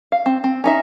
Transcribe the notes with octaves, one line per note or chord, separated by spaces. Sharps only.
F5
C4
C4
C#4 D#4 E5